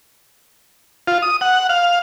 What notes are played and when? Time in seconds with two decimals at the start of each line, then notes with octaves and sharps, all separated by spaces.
1.08 F4
1.22 D#6
1.41 F#5
1.69 F5